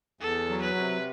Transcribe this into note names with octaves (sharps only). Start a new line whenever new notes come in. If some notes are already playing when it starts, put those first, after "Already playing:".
E2 A4
F#3
B4
C3